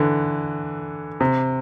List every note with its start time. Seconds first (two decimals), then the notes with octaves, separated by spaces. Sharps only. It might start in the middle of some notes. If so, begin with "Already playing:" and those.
Already playing: D3 E3
1.21 C3